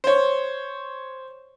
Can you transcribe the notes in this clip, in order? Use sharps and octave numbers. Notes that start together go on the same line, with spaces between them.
C5 C#5